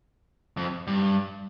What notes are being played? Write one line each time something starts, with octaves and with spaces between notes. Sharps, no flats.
F2
G2